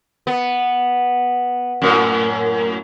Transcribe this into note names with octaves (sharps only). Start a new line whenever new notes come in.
B3
F#2 A2